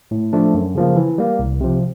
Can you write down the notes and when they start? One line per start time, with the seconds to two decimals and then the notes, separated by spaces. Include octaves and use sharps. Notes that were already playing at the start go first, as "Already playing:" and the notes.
0.11 A2
0.33 F3 A3 D4
0.54 F#2
0.75 C#3 F3 A#3
0.96 E3
1.18 G3 A#3
1.39 C2
1.61 C3 F3